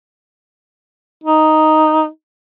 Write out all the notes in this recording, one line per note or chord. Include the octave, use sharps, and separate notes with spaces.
D#4